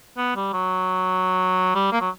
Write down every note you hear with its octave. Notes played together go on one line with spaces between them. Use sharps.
B3
G3
F#3
G3
A#3
F#3